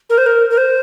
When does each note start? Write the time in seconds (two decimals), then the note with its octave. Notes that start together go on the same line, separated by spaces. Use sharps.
0.10 A#4
0.18 C5
0.26 A#4
0.50 A#4
0.57 C5